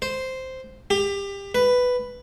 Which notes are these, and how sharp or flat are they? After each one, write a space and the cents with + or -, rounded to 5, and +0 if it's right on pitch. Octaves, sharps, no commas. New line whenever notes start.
C5 -5
G4 +25
B4 +5